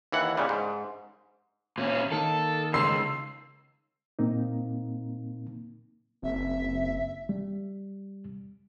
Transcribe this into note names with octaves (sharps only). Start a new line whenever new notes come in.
D#2 E3 F#5
A#2 C#3 G3
G#2
A#2 C#4
D#3 A#3 A4
C#2 C#3 C6 E6 C7
A#2 A#3 C4 D#4
F#1 C4 E5
G3